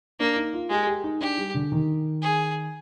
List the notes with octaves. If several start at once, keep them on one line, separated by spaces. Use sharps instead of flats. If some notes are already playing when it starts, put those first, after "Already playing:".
A#3 D4
D#4
F4
G#3 G4
G4
D#4
D4 G4
G3
D3
D#3
G#4